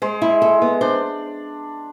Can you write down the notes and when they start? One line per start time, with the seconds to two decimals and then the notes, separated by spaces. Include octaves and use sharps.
0.02 G#3 C5
0.22 E4
0.42 A4
0.62 B3
0.81 D4 C5